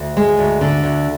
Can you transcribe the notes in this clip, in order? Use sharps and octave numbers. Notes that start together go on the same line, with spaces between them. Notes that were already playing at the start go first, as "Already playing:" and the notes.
Already playing: D2
G#3
D2
D3
D2